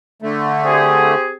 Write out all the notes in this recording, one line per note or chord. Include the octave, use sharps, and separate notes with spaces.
D3 A3
C4 G4 G#4